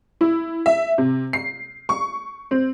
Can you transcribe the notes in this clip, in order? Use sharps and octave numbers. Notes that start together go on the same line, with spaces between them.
E4
E5
C3
C7
C#6
C4